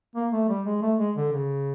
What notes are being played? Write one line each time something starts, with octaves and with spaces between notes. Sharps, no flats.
A#3
A3
G3
G#3
A3
G#3
D3
C#3